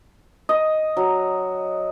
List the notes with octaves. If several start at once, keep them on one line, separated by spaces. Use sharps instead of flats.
D#5
F#3